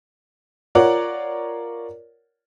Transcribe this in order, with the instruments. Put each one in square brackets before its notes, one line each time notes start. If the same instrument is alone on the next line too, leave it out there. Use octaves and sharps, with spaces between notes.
[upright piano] F4 A#4 C#5 D5 F#5